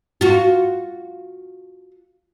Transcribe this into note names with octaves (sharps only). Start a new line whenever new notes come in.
F4 F#4